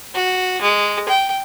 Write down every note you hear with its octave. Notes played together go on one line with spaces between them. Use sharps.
F#4
G#3
G5